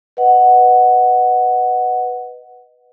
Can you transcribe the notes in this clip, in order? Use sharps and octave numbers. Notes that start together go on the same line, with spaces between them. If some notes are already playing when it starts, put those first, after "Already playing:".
B4 D#5 F#5